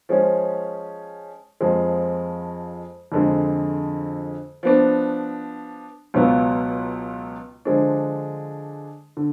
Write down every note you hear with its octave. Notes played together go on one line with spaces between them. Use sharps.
F3 G#3 C#4
F2 F3 G#3
F2 D3 G#3
F3 B3 D4
C#2 B2 F#3 B3 F4
D3 F3 G#3 D4
D3